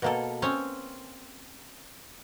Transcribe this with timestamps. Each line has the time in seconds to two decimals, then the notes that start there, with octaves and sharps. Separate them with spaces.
0.02 B2 A#3 A4
0.42 C4 C#4 C#5 G#5